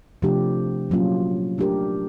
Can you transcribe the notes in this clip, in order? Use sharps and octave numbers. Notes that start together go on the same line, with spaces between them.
C3 F3 A3 D4 G4
A#2 F#3 A#3 C#4 F4
A3 D4 G4 A#4